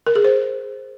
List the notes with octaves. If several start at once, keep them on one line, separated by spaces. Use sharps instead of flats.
A#4
G#4
C5